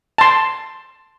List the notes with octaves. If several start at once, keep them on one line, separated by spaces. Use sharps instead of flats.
A5 C6